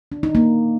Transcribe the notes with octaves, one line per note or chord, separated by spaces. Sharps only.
D4
D#4
A#3